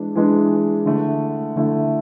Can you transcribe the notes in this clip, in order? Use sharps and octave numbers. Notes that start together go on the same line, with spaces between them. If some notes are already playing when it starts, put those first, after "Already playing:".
Already playing: E3 G#3 D4
E3 G#3 D4
D3 A3 E4
D3 A3 E4